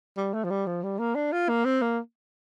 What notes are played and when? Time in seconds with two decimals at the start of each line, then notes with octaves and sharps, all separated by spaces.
0.17 G3
0.34 A3
0.44 F3
0.50 G3
0.67 F3
0.83 G3
0.99 A#3
1.15 D4
1.32 F4
1.49 A#3
1.65 C4
1.81 A#3